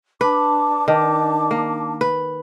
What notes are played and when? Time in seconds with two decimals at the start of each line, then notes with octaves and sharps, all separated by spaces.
0.21 D4 B4 A5 D6
0.88 D#3
1.51 A#3
2.01 B4